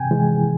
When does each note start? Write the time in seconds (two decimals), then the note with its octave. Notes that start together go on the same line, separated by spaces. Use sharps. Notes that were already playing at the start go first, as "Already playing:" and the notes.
Already playing: C3 G5 G#5
0.11 E3 G#3